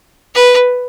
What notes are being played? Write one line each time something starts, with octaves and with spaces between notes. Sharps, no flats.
B4